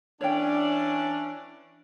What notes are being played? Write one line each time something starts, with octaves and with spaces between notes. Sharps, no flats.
E3 C#4 D4 C#5 G5